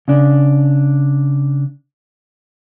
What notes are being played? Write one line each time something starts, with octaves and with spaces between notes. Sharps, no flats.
C#3 D4